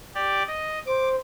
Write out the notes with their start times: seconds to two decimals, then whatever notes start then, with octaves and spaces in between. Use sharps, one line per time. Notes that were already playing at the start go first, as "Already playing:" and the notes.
0.15 G4 D5
0.47 D#5
0.86 C5 D6